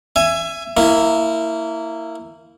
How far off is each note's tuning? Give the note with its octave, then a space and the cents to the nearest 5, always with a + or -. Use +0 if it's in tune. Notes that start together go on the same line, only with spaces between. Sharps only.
E5 +25 G#5 +0
A#3 -20 E4 +0